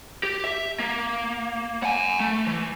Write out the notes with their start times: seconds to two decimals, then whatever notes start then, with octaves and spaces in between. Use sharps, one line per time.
0.23 G4
0.44 E5
0.80 A#3
1.83 F#5 G#5
2.20 A3
2.46 E3